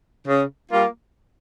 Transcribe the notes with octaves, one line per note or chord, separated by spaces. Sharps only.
C#3
G3 A#3 F4